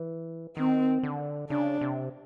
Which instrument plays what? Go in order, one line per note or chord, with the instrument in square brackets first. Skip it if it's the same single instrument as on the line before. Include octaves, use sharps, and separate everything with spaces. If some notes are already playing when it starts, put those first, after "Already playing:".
Already playing: [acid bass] E3
[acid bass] D#3 [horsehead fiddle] C4
[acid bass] D3
[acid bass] C#3 [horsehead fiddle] D4
[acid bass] C3